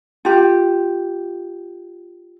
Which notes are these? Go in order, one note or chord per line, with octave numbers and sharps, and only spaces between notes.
F4 G4